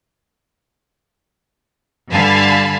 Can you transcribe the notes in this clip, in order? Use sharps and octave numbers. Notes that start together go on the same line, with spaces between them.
G2 D3 F5 G#5 A5 B5